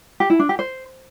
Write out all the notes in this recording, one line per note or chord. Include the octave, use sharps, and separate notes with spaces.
G4
E4
D4
G4
C5